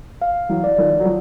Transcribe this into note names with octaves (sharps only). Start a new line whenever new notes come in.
F5
E3 F#3
D5
D#3 F3
F#3
F3